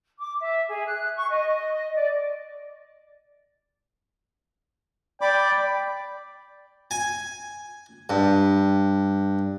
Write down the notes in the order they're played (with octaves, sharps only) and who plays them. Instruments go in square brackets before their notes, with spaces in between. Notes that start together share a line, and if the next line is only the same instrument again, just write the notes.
[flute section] D6
E5
G#4
F#6
C#6
D#5
D5
[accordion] D5 [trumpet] G5 [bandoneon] B5 D6
[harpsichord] G#5
G2